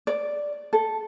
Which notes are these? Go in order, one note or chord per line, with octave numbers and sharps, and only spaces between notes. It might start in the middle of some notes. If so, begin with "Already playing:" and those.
D5
A4